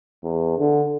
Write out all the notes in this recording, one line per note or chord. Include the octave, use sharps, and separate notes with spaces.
E2
D3